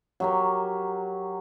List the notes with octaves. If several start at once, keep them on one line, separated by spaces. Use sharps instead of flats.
F#3 G4 A#4